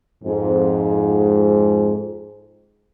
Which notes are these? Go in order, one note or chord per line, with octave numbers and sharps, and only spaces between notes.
F2 G#2